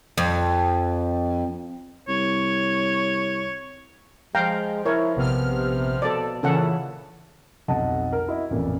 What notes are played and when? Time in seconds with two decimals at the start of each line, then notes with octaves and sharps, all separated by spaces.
0.18 F2
2.08 C2 C#5
4.35 F3 G#3 F5 G5 A#5
4.86 E4 A#4 C#5
5.16 A#1 C3 B3 F6
6.02 B2 A4 D5
6.43 A#2 C#3 E3 C#4 A4 F#5
7.68 B1 F2 D#5 F#5 A5
8.12 A#4
8.28 E4 F#4 D#5
8.50 A1 F2 A#2